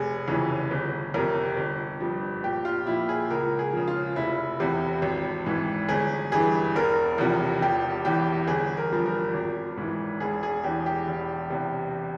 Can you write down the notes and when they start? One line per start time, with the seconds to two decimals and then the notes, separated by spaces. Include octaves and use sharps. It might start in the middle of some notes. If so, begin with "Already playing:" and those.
Already playing: F1 G#4
0.28 F2 C#3 E3
0.71 G1
1.14 F2 C3 A#4
1.57 G1
2.00 G2 F3
2.44 A#1 G4
2.65 F4
2.87 A#2 F3 E4
3.09 G#4
3.30 C#2 A#4
3.59 G#4
3.73 C#3 F3
3.88 F4
4.16 F1 E4
4.60 E2 C3
5.02 G#1
5.46 G#2 E3
5.89 G1 G#4
6.32 G2 E3 G#4
6.75 E1 A#4
7.18 E2 C3 F3
7.61 E1 G4
8.05 E2 E3 G4
8.47 G1 G#4
8.77 A#4
8.91 G2 F3
9.06 A#4
9.34 G#1
9.77 G#2 E3
10.20 E1 G#4
10.43 G#4
10.64 E2 E3 G4
10.86 G4
11.08 E1
11.50 E2 C3